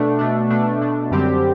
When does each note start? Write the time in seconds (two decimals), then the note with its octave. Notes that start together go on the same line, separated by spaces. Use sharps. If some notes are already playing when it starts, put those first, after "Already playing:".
Already playing: B2 A3 D4
0.19 B2 A3 D4
0.50 B2 A3 D4
0.81 B2 A3 D4
1.11 F#2 D3 G3 C4 G4